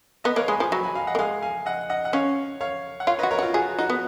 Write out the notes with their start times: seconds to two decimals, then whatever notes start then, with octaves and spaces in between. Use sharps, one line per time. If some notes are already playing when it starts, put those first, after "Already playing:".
0.24 B3 B4 D#5
0.36 A#3 C#5 F5
0.48 G#3 G#5 B5
0.60 F3 G#5 B5
0.72 F#3 G#5 B5
0.84 G#5 B5
0.95 F5 G#5
1.07 D#5 F#5
1.15 A#3
1.19 G#3 F5 G#5
1.42 F5 G#5
1.66 D#5 F#5
1.90 D#5 F#5
2.05 F#5
2.13 C#4 C#5 F5
2.61 C#5 F5
3.00 F#5
3.07 F4 C#5 F5
3.19 F#4 B4 D#5
3.31 A#4 C#5
3.39 F#4
3.43 F4
3.54 F#4 G#4
3.79 D#4 F#4
3.90 B3